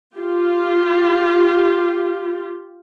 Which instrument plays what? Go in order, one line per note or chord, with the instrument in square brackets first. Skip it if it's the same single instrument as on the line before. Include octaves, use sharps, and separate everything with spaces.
[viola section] F4 G4